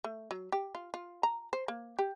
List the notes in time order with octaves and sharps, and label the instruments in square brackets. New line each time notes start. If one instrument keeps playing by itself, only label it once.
[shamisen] A3
F#3
G4
F4
F4
A#5
C5
A#3
G4